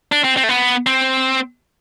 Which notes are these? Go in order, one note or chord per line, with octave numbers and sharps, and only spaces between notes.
D4
C4
C4
A3
B3
C4